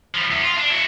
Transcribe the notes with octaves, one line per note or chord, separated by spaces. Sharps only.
F3 E4
E2
F4
D4
E4 F#4